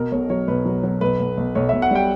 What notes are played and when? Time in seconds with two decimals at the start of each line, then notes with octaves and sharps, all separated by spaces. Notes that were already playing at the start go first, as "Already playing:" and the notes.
Already playing: B2 A#4
0.12 B1 C#5
0.30 F#3 C#5
0.48 B1 B4
0.65 F#3
0.83 F#3
1.01 B1 B4
1.20 B1
1.37 B1
1.55 B1 C#5
1.69 B1 E5
1.82 F#5
1.91 G3 G5